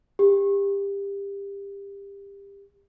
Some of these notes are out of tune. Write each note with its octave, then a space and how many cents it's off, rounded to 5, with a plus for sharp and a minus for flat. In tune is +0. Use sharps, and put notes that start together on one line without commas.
G4 +25